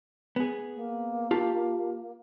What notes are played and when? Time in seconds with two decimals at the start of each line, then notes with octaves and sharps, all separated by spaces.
0.36 B3 G#4
0.75 A#3
1.31 F4 G4 A5